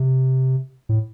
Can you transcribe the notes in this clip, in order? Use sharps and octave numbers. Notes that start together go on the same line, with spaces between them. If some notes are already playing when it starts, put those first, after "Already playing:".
Already playing: C3
A2